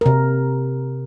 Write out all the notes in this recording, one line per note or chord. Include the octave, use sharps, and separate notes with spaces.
C3 A#4